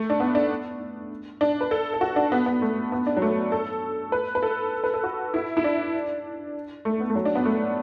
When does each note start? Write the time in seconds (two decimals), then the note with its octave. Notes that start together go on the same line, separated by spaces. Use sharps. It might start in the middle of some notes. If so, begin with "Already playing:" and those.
Already playing: A3
0.10 D4
0.20 B3
0.35 D4
1.41 D4
1.61 B4
1.71 A4
1.94 A4
2.01 F#4
2.16 D4
2.32 B3
2.46 B3
2.62 A3
2.92 B3
3.07 D4
3.17 F#3
3.22 A3
3.52 A4
4.12 B4
4.35 B4
4.43 A4
4.84 B4
4.94 A4
5.04 F#4
5.34 E4
5.57 E4
5.64 D4
6.85 A3
7.00 B3
7.10 A3
7.15 F#3
7.25 D4
7.35 B3
7.45 A3